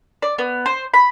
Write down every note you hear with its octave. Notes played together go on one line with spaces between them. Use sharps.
D5
B3
C5
B5